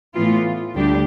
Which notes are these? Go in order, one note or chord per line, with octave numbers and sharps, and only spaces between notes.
A2 E3 B3 F4
D2 D3 G3 D4 G4